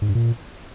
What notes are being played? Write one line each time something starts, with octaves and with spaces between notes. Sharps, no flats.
G#2
G2
A#2